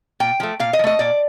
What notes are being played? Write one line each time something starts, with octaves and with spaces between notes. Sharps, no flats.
A#2 G5
F3 A3
A#2 F5
D#5
F3
A3 D#5
A#2 D5